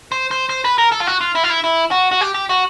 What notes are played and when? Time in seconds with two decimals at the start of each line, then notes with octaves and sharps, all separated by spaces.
0.12 C5
0.31 C5
0.49 C5
0.65 B4
0.78 A#4
0.92 A4
1.01 F4
1.07 F#4
1.21 F4
1.35 E4
1.43 F4
1.49 E4
1.64 E4
1.91 F#4
2.11 F#4
2.21 G4
2.34 G4
2.49 F#4